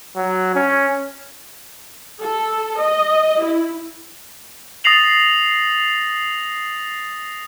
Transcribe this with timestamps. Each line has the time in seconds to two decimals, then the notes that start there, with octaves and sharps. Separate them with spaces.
0.16 F#3
0.55 C#4
2.22 A4
2.80 D#5
3.42 E4
4.84 D#6 A6 A#6 C7 F7 F#7